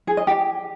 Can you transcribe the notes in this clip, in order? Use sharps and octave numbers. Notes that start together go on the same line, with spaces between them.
G#4
D#5
G4